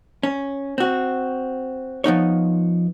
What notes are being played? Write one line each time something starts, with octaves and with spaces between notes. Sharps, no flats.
C#4
C4 F#4
F3 B3 D#4 C#5